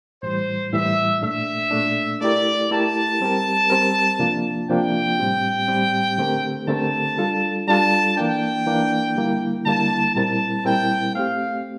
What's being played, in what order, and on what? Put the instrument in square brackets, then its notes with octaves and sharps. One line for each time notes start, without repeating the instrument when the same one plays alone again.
[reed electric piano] A2 E3 G3 [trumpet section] C5
[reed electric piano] A2 E3 G3 [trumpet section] E5
[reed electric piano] A#2 A3 D4 [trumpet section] E5
[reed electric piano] A#2 A3 D4
[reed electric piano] A3 E4 G4 A#4 [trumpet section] D5
[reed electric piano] A3 E4 G4 A#4 [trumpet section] A5
[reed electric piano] G3 C4 G4 A#4
G3 C4 G4 A#4
C3 F3 A#3 D4 F4
[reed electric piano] C3 F3 A#3 D4 F4 [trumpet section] G5
[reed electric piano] A2 G3 C4 G4
A2 G3 C4 G4
D3 A3 C4 G4 A#4
[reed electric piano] D3 A3 C4 G4 A#4 [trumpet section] A5
[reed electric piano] G3 D4 F4 A4
[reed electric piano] G3 D4 F4 A4 [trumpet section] A5
[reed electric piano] E3 A#3 D4 [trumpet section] G5
[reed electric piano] E3 A#3 D4
D3 G3 A#3 E4
[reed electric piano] D3 G3 A#3 E4 [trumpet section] A5
[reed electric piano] A#2 G3 C4 E4 A#4 [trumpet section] A5
[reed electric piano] A#2 G3 C4 E4 A#4 [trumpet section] G5
[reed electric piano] A3 C4 G4 [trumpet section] F5